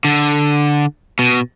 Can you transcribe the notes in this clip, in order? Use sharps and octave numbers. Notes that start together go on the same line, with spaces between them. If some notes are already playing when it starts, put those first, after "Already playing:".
D3
B2